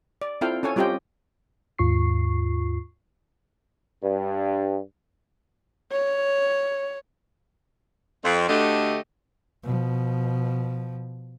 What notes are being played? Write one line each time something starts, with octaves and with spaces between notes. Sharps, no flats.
D5
C4 E4 F4 A4 F5 G5
C#4 A4 C#5 G#5
G3 C4 F4 G4 D#5 G5
D#2 G#2 F4 C#6 C7
G2
C#5
F2
D2 D3 A3 G4 D#5
B2 F3